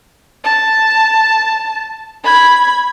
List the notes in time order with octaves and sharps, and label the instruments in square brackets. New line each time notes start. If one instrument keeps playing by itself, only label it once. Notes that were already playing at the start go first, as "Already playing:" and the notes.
[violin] A5
B5 G#6